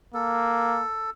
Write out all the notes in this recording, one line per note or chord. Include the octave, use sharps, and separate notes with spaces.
A#3 A4